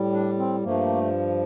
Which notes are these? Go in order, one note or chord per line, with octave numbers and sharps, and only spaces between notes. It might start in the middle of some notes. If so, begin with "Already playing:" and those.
Already playing: A2 G3
D4
C4
G2 F3 A3 A#3